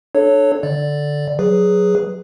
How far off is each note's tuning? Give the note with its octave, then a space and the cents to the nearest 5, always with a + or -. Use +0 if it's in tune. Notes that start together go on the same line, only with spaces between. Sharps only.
D4 +25 A4 -15 C#5 +0
D3 +0 D5 +0
F#3 +0 G#4 +0 B4 +0